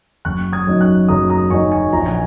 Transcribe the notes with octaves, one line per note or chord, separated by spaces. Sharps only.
F#1 C#6 F#6
D#6 G#6
F#2 F#3 D#4
C#6 F#6
F#1 A#5 D#6
A#5 D#6
F#2 F#3 D#4 G#5 C#6
G#5 C#6
A#1 A#5
G#5